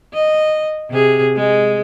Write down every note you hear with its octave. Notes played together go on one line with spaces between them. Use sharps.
D#5
C3 G#4
G#3